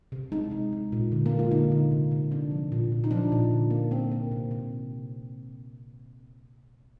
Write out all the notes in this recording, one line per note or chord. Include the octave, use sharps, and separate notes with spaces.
C3
G#3 D#4
G#3
G#3
A#2
D3
A#3
G#3
F4
D3 D#4
D3
C3
C3
C3 D4
F3
A#2
A#2
D#4
F3 D4
A#2
D3
A#3
A#3 C4
A#3
C3
C3